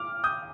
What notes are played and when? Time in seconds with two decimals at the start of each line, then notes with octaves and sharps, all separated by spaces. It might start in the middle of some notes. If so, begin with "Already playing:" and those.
Already playing: D6 F6
0.24 D#6 G6